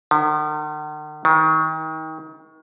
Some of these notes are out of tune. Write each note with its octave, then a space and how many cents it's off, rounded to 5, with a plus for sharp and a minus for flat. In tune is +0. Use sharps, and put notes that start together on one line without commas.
D#3 -45
D#3 +30